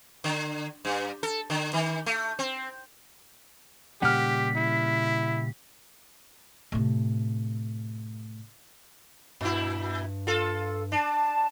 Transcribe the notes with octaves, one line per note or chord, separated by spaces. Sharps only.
D3
G2
A4
D3
D#3
A3
C4
A#2 C#3 G3 G4 F#5 F6 B6
E4
A2 C3
G2 A#2 E4
F4 A4
D4 A5